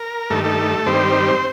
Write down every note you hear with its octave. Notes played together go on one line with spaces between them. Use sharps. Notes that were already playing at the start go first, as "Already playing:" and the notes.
Already playing: A#4
G2 D#3 A3 A4
A3 A4
G2 D#3 G3 C4 C5